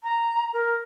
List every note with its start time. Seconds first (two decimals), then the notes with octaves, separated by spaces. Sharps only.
0.04 A#5
0.53 A#4